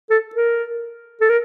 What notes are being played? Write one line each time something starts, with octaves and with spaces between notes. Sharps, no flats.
A4
A#4
A4
A#4